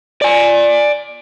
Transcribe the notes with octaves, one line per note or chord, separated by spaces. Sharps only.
D5 G#5